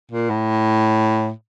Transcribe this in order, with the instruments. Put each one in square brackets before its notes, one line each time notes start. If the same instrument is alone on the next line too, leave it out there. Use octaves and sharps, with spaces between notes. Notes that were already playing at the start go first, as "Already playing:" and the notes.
[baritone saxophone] A#2
A2